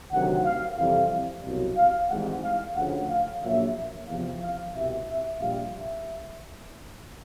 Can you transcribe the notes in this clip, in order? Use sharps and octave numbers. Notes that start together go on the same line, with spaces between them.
D2 C3 D#3 F#3 F#5
F5
F2 C3 E3 G3 F5
C2 B2 F#3
F5
G#1 G#2 E3 G3 F#5
F5
D2 C#3 F3 F#5
F5
A#1 A#2 F#3 E5
E2 C3 F3 F5
F5
C2 B2 G3 E5
E5
A#1 A#2 G3 F5
E5